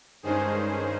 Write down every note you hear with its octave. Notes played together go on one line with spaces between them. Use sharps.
G2 D#3 G#3 C#4 G#4 C5